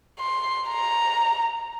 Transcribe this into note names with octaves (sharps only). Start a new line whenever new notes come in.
C6
A#5